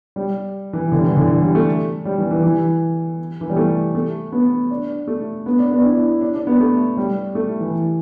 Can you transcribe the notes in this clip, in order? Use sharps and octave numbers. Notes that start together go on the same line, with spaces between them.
G3
E3
D3
G3
E3
D3
E3
G3
A3
G3
E3
E3
E3
E3
G3
A3
A3
B3
D4
A3
B3
D4
B3
D4
E4
D4
D4
B3
A3
G3
A3
E3